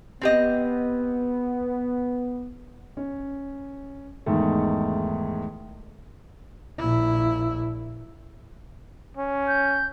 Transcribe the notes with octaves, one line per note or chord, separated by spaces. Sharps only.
B3 C4 G4 D#5
C#4
E2 G#2 D#3 A3
A#1 E4
C#4
G6